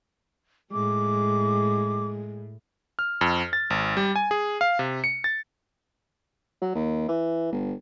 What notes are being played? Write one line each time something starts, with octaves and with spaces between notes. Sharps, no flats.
A2 G#3 D6
F6
F2
A6
G#1
G3
G#5
G#4
F5
C3
C#7
A6
F#3
D#2
E3
G1